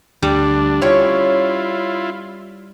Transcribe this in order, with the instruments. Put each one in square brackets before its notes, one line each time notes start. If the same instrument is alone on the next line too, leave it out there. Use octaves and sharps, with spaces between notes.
[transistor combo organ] D2 D4 [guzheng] G3
[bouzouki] C#4 C#5 G5 [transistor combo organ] E4 F4